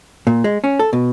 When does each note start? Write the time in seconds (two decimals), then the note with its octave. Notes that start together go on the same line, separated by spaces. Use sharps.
0.27 A#2
0.44 G#3
0.64 C#4
0.79 A4
0.93 B2